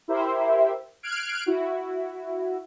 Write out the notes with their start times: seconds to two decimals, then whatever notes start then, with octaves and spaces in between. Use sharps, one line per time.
0.08 E4 G4 A#4 C5 E5
1.03 F6 F#6 G#6 C7 D7
1.46 E4 F#4